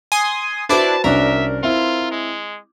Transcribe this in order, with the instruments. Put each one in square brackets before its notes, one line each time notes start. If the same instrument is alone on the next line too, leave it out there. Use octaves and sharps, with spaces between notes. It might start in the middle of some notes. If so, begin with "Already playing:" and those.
[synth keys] G#5 C6 D#6
[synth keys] D4 E4 D5 [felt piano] F#4 B4 C5 [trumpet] A5
[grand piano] C2 C#4 D4 [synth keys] A#4 [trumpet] E5
[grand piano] C4 E4 [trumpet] F4
[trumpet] G#3